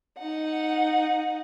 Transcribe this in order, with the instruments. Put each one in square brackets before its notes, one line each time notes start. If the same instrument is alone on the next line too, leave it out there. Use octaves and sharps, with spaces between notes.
[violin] D#4 F#5